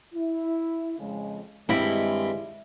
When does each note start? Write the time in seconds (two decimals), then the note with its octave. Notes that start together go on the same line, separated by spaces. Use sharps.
0.14 E4
0.99 F2 C#3 G#3
1.69 G2 D#3 G#3 C4 E4 B5